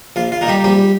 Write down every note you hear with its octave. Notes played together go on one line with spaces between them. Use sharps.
A#1 F4
F4
A#2 A#3 D#4
G3 G4
A#1 G3 G4